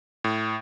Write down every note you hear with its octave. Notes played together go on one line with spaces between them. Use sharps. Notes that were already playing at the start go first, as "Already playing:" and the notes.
A2